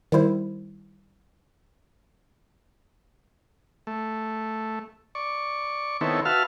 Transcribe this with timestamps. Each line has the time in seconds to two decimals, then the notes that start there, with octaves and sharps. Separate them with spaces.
0.12 D#3 G3 E4 C5
3.87 A3
5.15 D5 C#6
6.01 D#3 B3 C4 E4 A4 C#5
6.25 F#4 B4 E5 F5 A5 F6